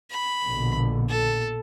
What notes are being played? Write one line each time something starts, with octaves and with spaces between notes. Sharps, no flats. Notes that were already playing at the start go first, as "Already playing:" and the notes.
B5
A#1 B2 D3
A4